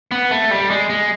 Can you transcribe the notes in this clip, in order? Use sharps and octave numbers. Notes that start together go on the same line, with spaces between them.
B3
A3
G3
G#3
G#3